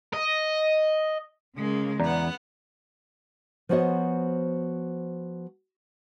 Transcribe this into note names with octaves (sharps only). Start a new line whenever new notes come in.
D#5
C#3 G#3 A#3
E2 B3 D5 F#5 A#5
F3 B3 F#4 C5 C#5 D#5